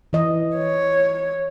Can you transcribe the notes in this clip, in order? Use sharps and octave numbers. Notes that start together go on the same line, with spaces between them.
E3 D#5
C#5